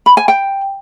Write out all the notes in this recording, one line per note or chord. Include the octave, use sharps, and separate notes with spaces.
B5
G#5
G5